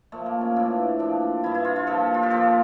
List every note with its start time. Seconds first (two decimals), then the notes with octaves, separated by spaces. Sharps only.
0.12 A#2 F3 A3
0.26 A#3
0.41 C#4
0.56 A2 E3 D4
0.99 A#2 F3 D4
1.43 G2 E3 E4
1.55 E4
1.65 F4
1.76 F4
1.87 A#2 F3 A4
2.14 F4
2.23 G4
2.30 A#2 F3 A4